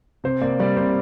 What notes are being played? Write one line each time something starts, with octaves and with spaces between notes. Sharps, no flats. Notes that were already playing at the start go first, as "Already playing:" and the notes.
C3 C5
A#3 D5
G3 D5
C3 C5